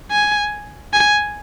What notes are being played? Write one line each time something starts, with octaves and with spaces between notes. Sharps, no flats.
G#5
G#5